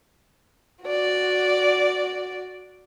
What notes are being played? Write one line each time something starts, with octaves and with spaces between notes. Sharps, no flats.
F#4 D5